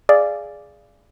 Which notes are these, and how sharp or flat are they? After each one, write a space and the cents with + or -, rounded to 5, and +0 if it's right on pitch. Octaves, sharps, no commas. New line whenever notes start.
G#4 +0 D5 +0 F5 -30